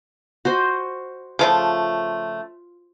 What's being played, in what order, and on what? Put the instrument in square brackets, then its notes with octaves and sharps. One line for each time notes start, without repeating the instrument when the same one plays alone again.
[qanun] F#4 C5 D#5
[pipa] C#3 F3 A3 [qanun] F4 D6